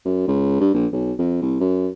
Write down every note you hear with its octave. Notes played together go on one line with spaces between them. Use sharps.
F#2
C#2
G2
A#1
B1
F2
C2
F#2